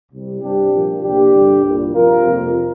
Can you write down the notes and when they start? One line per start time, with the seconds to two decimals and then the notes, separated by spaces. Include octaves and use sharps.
0.11 C2 C3 G3
0.41 G2 G3 C4 D4 G4
0.72 A#2 F3 A#3
1.02 C2 C3 A#3 D4 G4
1.32 G2 D3 G3
1.63 C2 A#2 G3
1.94 G2 F3 C4 F4 A#4
2.24 F2 C3 F3 A#3